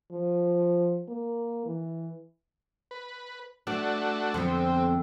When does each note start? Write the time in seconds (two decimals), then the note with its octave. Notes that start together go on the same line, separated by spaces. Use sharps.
0.12 F3
1.09 A#3
1.66 E3
2.91 B4
3.67 A3 D4 F#4 D5
4.34 F2 D3 B3 C4